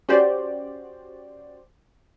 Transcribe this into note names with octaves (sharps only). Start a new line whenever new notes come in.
C#4 F#4 G4 C5 D5